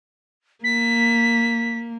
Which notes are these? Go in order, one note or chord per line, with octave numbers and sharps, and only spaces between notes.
A#3 B6